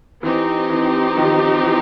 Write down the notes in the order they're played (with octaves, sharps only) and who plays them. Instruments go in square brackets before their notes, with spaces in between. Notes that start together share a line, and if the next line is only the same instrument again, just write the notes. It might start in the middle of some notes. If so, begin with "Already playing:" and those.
[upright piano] E3 [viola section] C4 D#4 G4
[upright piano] E3
D#3 F3
E3